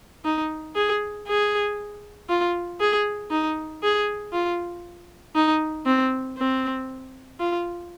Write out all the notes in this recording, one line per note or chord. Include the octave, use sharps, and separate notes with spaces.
D#4
G#4
G#4
F4
G#4
D#4
G#4
F4
D#4
C4
C4
F4